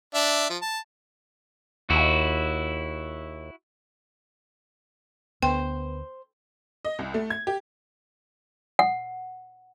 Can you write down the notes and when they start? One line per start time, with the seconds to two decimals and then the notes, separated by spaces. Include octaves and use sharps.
0.14 D4 E5
0.50 F3
0.62 A5
1.90 D#2 E4 F#4
5.43 D2 B3 C5 G5
6.85 D#5
6.99 C2
7.14 A3
7.30 G#6
7.47 G4
8.79 F#5